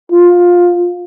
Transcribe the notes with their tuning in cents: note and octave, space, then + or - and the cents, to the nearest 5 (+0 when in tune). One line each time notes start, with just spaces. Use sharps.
F4 +15